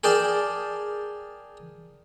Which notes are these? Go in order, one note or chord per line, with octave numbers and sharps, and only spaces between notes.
G#4 A#4 D5 G5 A5